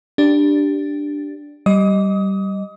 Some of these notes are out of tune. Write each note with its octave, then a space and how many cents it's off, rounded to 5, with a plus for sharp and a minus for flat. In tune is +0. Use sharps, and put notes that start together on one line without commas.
D4 +0 G4 +0
G3 -15 D#5 +0 D#6 +25